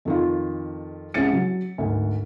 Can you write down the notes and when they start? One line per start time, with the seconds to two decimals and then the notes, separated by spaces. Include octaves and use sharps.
0.05 F2 D#3 F4
1.14 C2 G#3 C#4 A6 C#7
1.33 F#3
1.78 G#1 D2